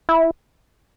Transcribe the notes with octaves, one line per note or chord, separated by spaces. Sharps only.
E4